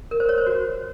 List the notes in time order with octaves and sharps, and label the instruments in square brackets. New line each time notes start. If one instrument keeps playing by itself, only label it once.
[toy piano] A#4
C5
C#5
C5
F#4